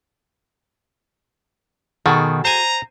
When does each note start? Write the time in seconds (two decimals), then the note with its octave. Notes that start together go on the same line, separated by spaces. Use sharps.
2.06 B2 D#3 F#4 G#4 A4
2.45 C5 G#5 A#5